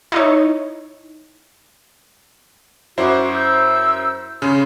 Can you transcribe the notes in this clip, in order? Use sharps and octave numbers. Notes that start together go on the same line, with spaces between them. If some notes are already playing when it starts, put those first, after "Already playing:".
D#4 E4 C#5
F#2 E4 F#4 C5 D6
E6 G6
C#3 C#4 C6